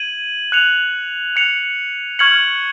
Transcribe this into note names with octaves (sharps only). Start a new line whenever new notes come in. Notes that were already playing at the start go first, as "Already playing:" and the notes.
Already playing: G#6 D#7 F#7
F#6 C#7 F7
F#6 C#7 F7
C#6 F6 G#6 C#7 F#7